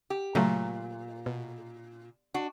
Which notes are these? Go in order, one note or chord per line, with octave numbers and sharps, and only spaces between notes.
G4
A#2 C#3 F#3 A3
B2
D4 F#4